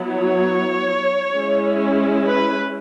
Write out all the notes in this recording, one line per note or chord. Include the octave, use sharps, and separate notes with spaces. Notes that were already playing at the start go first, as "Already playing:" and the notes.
Already playing: F#3 B3 E4
C#5
G#3 C#4 E4
B4